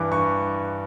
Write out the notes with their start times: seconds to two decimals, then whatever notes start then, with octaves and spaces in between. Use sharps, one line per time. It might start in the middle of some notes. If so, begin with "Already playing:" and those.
Already playing: G2 E3 D6
0.12 G2 C#6